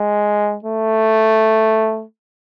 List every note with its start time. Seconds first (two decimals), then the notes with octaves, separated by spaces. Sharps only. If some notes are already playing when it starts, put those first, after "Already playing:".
Already playing: G#3
0.64 A3